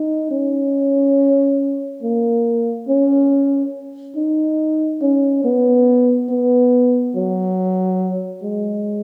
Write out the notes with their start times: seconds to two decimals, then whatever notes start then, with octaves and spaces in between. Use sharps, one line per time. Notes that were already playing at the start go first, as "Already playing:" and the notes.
Already playing: D#4
0.31 C#4
2.03 A#3
2.88 C#4
4.16 D#4
5.01 C#4
5.44 B3
6.29 B3
7.15 F#3
8.42 G#3